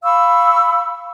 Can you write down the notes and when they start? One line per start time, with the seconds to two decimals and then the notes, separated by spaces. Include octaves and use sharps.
0.03 F5 B5 C#6 E6